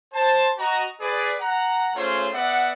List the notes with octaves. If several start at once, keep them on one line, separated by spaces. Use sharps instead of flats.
C5 A5
F#4 D#5 A#5
G#4 B4 D5
F#5 A#5
A3 C#4 F4 G#4 C5 C#5
B3 D5 E5 F#5